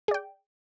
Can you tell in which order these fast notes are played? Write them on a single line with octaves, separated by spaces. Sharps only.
G#4 D5 G5